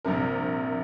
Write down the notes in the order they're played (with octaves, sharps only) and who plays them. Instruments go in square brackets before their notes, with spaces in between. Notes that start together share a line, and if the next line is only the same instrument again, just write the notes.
[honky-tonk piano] A#1 G2 C3 A#4